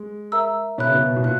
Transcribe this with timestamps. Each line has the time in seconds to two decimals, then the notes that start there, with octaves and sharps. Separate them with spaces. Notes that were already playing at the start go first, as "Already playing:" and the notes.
Already playing: G#3
0.32 A#4 E5 A#5 E6
0.78 B2 C#5 E5 B5 F#6
0.87 C#3
0.95 B2
1.16 B2
1.24 A#2 F#6